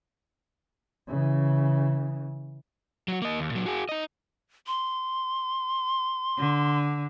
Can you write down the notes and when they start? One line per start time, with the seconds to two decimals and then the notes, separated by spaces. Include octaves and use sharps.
1.07 C#3 E3
3.08 F#3 F#4
3.22 A#3 D#5
3.40 D#2
3.51 A#2 F#3
3.66 F#4 G#4
3.89 D#4 D#5
4.67 C6
6.38 D3